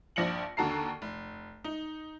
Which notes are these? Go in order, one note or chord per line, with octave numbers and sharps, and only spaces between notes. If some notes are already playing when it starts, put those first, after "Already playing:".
A#1 G2 F3 A#6 C#7 F#7
D#2 D3 F#4 A4 A#5 C7
F1
D#4